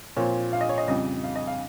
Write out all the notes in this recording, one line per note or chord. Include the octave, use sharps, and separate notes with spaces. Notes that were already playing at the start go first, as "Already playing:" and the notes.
A#2 F3 C4 C#5
F5
D#5
C#5
D#5
F2 C#3 G3 D#5
F5
D#5
F5